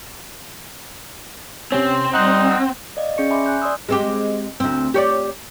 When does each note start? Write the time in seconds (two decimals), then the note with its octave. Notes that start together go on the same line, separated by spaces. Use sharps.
1.72 C3 C4 C#4
2.14 G3 D#4 F#5 F#6
2.97 D5 D#5 F5
3.18 C#4 G#4 D5 C#6 C#7
3.30 E5 G#5 B5 C6 D6
3.46 G#5 F#6 G6
3.62 D5 C6 D#6 E6
3.89 G#3 C4 G4
4.60 D2 C4
4.94 G4 C#5 D5